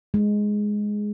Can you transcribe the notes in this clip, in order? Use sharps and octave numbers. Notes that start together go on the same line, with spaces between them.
G#3